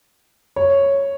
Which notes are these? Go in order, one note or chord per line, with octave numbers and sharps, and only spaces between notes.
C#5